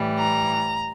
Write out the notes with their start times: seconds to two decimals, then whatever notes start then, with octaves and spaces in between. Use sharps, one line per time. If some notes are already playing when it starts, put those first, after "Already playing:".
Already playing: A2 E3 G3
0.19 A#5